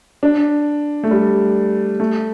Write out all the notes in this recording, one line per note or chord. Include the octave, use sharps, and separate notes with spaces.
D4
A3
G3
A3